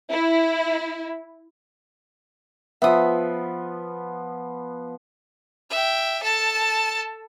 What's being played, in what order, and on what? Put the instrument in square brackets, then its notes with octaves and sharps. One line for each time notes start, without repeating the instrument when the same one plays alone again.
[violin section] E4
[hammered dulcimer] F3 B3 [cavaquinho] E5 D#6
[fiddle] E5 G5
A4 A5